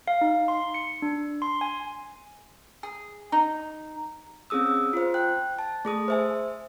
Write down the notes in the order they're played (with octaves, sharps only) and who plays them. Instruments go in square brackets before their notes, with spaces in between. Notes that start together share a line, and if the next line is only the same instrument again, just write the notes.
[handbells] F5
D#4
C6
C#7
D4
C6
G#5
[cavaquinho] G#4
D#4
[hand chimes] C4 C#4 G#4 D#6 E6
F4 C5
G5 F#6
A5
A3 G#4 D#6
C5 E5 G#5